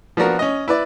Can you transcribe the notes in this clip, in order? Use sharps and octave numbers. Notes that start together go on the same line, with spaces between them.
F3 B3 D4 F#4 A#4
C#4 D#5
E4 B4 D5